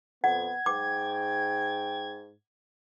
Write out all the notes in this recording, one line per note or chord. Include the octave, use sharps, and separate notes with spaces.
F2 B3 F#5 G#6
G#2 G5 D6